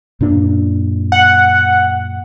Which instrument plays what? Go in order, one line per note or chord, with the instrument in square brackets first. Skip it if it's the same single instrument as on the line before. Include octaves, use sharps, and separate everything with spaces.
[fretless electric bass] F#2 A#2 D4
[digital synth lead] F#5